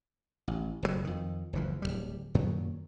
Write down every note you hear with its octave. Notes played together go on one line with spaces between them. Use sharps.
A1
F#1 G2 A#2 F#3
F2 D#3
F#1 D2 E3 F3
D1 C#2 G3
F#2 A#2 D#3 F#3